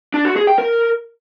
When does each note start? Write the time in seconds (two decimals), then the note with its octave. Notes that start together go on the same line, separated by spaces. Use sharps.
0.14 D4
0.25 F#4
0.36 G#4
0.47 G5
0.58 A#4